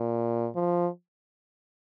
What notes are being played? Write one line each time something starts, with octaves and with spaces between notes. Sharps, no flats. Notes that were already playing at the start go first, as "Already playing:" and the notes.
Already playing: A#2
F3